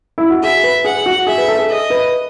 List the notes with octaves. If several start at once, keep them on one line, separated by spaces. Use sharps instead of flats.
E4
F#4
G#4 E5
B4
G#4 F#5
F#4
G#4 E5
B4
A4
G#4
D#5
B4